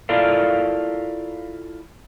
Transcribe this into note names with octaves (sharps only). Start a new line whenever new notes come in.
E4 F4 A4 A#4 D5 F5